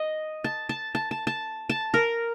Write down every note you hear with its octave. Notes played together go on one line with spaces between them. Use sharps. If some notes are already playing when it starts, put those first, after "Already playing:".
Already playing: D#5
A5
A5
A5
A5
A5
A5
A#4